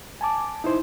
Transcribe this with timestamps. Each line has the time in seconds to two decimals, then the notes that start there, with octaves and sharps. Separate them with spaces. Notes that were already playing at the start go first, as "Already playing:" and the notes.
0.21 G#5 A5 D6
0.64 D#4 E4 C5